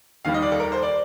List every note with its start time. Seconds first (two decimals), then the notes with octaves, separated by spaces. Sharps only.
0.25 D#2 D#3 G3 F5
0.34 D#5
0.42 D5
0.52 A4
0.60 A#4
0.72 C5
0.83 D5